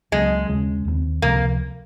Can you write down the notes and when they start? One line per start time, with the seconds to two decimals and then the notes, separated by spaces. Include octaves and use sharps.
0.12 C#2 C#3 F#3 G#3 A#3
0.48 D#2 C#3 G#3 C#4
0.85 D#2 D#3 F#3 C4
1.22 C#2 C3 F3 A#3